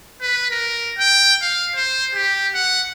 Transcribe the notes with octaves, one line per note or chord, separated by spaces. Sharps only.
B4
A#4
G5
F5
C5
G4
F#5